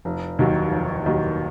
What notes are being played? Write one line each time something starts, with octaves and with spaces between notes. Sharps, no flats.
F1
D#2 D#3 F#3
F1
D#2 D#3 F#3